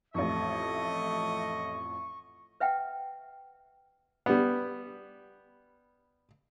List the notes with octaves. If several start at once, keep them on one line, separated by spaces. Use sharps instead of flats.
A1 F2 A3 D#5 C#6
B4 E5 F#5 G5
G3 B3